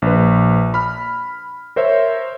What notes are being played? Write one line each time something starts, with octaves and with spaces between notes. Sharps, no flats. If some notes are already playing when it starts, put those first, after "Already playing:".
A#1 B4
B5 F6
A#4 C5 C#5 E5